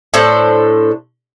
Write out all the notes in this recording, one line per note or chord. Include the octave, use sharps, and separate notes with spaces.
A2 D4 A4 C5